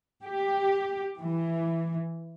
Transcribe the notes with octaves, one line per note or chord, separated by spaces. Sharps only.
G4
E3